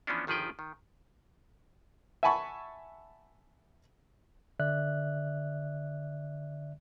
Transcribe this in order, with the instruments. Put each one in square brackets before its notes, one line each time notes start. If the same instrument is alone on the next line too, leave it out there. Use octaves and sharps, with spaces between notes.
[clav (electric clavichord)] E3 F3 B3 C#4 D4
G1 D#3 F3 G#4 B4 G5
D#3
[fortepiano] E5 F#5 G#5 A5 B5 C#6
[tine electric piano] D3 D5 E5 F#6